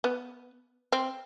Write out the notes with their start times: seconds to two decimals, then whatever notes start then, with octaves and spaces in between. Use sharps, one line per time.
0.04 B3
0.92 C4